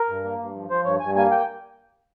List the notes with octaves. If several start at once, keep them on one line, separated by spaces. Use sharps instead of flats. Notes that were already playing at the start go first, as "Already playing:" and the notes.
Already playing: A#4
G2
A#3
G2
F3
F3 C5
G2 C#5
G2 G#5
A#3 G#5
G5